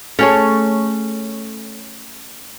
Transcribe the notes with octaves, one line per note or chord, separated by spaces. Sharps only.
A3 C#4 G#4 C#5